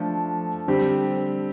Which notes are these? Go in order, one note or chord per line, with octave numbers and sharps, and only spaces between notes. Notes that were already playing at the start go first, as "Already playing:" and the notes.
Already playing: F3 A3 D4 F4 A4
D3 G3 C4 G4